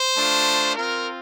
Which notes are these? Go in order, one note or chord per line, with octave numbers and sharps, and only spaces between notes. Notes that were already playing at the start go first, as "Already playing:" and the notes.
Already playing: C5
A3 D4 F4
C4 F4 A#4